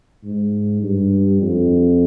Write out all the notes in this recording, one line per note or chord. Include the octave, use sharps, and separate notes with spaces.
G#2
G2
F2